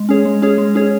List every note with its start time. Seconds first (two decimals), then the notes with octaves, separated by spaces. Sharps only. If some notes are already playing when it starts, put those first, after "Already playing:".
Already playing: G#3
0.09 C#4 G#4 C#5
0.25 G#3
0.42 C#4 G#4 C#5
0.58 G#3
0.75 C#4 G#4 C#5